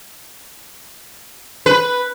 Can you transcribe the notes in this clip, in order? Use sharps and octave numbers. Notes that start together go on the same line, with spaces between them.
B4